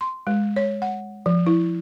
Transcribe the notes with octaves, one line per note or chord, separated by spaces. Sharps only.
C6
G#3
C#5
F#5
F3
E4